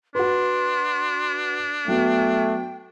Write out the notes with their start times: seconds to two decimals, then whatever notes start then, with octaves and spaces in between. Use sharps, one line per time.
0.15 D4 F#4 B4 C6
1.88 F#3 A3 B3 G5